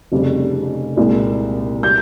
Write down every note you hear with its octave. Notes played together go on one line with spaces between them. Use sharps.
F1 F2 C#3 G3
C2 A#2 G#3
G3 G6